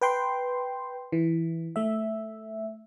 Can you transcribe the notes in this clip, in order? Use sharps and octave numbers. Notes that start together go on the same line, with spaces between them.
B4 G5 C6
E3
A3 E5